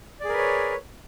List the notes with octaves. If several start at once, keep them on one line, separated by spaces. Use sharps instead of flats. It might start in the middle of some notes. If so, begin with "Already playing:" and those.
G#4 A#4 B4 C#5 D5